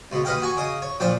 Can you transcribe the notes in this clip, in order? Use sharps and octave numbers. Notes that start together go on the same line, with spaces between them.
C#2 B2
D#2 B4 D#5 F5 G5
F#4 G#5 C#6
C#3 D#5 D#6
C#5
A#2 F3 D4 G5